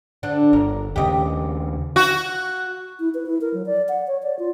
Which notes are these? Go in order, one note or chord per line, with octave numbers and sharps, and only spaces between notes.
D3 D4
G1 A#4
D#2 C#3 G4 D#5
F#4
E4
B4
E4
A#4
F#3
D5
F#5
C#5
D5
F4